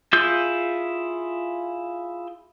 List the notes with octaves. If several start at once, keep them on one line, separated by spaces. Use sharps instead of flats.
E4 F4 G#4 E6 G6